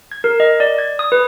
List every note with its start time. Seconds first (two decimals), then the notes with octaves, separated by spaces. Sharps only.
0.12 G#6
0.24 A#4
0.40 D#5
0.60 D5
0.78 G#6
0.99 D#6
1.12 B4